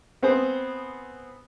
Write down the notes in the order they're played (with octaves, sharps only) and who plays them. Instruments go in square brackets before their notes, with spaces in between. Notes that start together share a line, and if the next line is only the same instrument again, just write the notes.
[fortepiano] B3 C4 G#4 C5